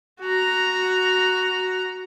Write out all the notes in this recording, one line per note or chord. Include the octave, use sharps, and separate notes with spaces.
F#4 A#5